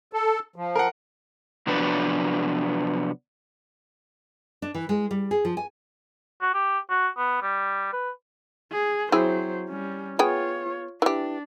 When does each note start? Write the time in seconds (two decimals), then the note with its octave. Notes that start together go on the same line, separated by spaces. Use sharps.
0.13 A4
0.56 F3
0.76 A#4 F#5
1.67 C3 F3 F#3 B3 D4 B4
4.62 D4
4.75 E3
4.89 G#3
5.11 G3
5.31 G#4
5.45 F3
5.57 G#5
6.42 F#4
6.54 G4
6.90 F#4
7.17 B3
7.42 G3
7.93 B4
8.72 G#4
9.12 F#3 C4 E4 G#4 C5
9.69 G3 C#4
10.19 B3 F4 G#4 C#5 G5
11.02 E3 D4 G4